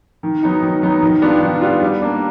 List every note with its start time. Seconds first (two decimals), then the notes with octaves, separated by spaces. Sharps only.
0.23 D#3
0.43 F#3 B3 D#4
0.63 D#3
0.82 F#3 B3 D#4
1.03 D#3
1.22 G3 B3 D4 F4
1.42 D#3
1.62 G3 B3 D4 F4
1.82 G3
2.02 A#3 D4